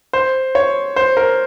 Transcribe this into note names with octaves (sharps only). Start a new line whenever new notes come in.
C5
C#5
C5
A#4